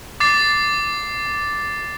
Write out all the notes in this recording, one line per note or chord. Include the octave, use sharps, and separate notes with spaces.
D6 A6 C7